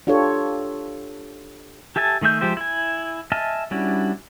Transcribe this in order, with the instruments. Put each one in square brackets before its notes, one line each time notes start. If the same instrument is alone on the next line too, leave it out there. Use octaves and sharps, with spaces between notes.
[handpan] D4 F4 G4 A4 C#5
[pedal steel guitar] G4 A4 E5 G#5 A5
D#3 A3 G#4 E5 G6
F3 G#3 G4 C5 E5
E4 G#5
D#5 E5 G#5 A5 F6
G3 C#4 D4 E4 F#4